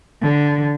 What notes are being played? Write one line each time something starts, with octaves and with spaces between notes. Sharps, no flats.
D3